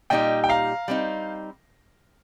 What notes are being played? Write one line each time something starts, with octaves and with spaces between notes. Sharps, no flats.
A#2 G3 D#4 G4 D#5 G5
G5
F5 A#5
G3 C4 D#4